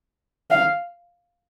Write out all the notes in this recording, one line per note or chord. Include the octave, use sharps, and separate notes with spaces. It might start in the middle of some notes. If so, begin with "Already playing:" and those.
F5